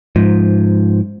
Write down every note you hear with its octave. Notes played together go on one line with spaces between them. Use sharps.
G#2 F3